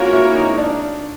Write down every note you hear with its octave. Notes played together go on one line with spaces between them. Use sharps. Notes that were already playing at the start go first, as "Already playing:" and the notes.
Already playing: A#3 C#4 D#4 F4 F#4 A#4 C#5
E4
D#4
D4